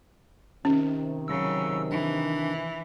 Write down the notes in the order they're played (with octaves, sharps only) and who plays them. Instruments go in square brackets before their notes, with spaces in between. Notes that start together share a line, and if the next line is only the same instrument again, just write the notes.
[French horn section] C3 D#3 [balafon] C#4
[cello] C#3 F#3 [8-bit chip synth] E6
[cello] E3 [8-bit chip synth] D4